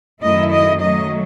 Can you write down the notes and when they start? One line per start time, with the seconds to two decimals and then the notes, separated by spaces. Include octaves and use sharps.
0.22 F#2 D#3 A3 E4 D#5
0.52 D#5
0.80 D#3 F#3 A3 D#5